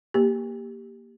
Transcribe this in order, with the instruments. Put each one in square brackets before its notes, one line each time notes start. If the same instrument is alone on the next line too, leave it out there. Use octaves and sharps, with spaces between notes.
[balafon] A#3 G4